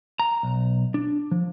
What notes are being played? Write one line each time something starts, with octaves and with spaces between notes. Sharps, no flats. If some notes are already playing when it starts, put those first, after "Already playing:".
A#5
B1
D4
F3